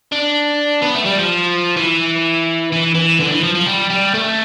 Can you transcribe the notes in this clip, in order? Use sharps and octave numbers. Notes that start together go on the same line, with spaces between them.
D4
B3
A3
G3
F3
E3
E3
E3
D3
E3
F3
F3
G3
G3
A3